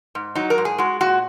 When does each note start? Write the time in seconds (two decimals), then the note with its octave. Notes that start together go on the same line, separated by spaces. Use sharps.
0.15 G#2
0.35 F#3 D#4
0.50 A#4
0.58 G#2
0.65 G#4
0.78 G#3 F#4
1.01 A#2 F#4